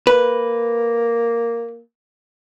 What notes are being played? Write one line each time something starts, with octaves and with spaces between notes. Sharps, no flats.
A#3 B4